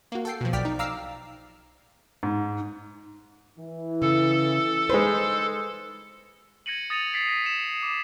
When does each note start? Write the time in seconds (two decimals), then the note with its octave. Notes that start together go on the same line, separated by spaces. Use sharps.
0.12 A#3 F#4
0.25 A4 G5 C7
0.41 B2 F3
0.53 B1 D5 G5 F6 B6
0.65 D#4
0.79 F5 A#5 D6 E6 F6 C7
2.23 G#2
3.59 E3
4.02 C#3 A4
4.90 G#3 D#4 B4 C5
6.66 G#6 A#6 C#7 D#7 F#7
6.90 D#6 A6 A#6 C#7 D#7 F7
7.13 A6 B6 C7 D7
7.28 A#6 D#7
7.44 C#7 E7
7.83 D6